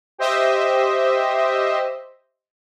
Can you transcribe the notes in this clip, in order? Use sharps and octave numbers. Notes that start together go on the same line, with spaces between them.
G4 C5 D#5 E5